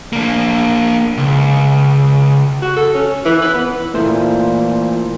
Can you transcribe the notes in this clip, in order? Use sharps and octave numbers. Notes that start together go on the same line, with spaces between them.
A#3 D4
C#2
F#4
A4
C#4
E3
B4
B3
A#2 E3 A3 E4 A#4 C5